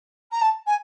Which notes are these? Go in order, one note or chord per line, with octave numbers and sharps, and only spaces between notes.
A#5
A5
G#5